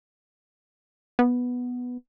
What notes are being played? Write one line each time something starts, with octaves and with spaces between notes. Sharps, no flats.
B3